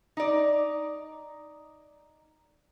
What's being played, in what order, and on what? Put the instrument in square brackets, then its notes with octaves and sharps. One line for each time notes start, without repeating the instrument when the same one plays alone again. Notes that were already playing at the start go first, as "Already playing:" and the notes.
[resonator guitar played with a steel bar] D#4 D5